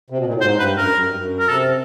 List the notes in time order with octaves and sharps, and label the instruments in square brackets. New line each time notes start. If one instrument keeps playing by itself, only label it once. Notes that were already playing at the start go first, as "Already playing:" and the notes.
[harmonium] C3
B2
A#2
A2
[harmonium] G#2 [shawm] C5
[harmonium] G2 [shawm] B4
[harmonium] F#2 [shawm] A#4
[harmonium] F#2
G2
F#2
[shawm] A#4
[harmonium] C3 [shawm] A4